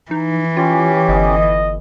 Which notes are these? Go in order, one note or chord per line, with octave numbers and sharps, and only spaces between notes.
E3 D#4
C#4 F4 G4
G1 D#5